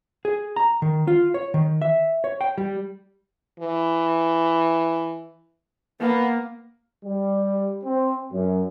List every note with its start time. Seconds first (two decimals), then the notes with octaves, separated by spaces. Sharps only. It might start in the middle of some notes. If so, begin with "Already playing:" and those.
0.25 G#4
0.56 A#5
0.82 D#3
1.08 F4
1.34 C#5
1.54 D#3
1.82 E5
2.24 C#5
2.41 G5
2.58 G3
3.60 E3
6.00 A#3 B3
7.05 G3
7.84 C4
8.33 F#2